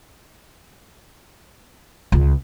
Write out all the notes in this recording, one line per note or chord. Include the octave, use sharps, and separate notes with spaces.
C#2